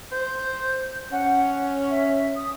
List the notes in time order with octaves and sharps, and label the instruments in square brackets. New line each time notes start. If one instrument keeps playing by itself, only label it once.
[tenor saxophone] C5 [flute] G6
[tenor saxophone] C#4 [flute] F#5
[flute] E5
D#6